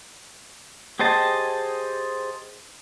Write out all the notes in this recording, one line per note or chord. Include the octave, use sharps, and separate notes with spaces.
G4 G#4 C5 D#5 A5